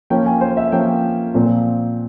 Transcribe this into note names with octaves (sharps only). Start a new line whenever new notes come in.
F3 A#3 C#4 G5
G#5
C5
E5
F3 A#3 C#4 G5
A#2 F3 C4